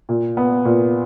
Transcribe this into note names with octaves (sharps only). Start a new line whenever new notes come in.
A#2
B3
A#2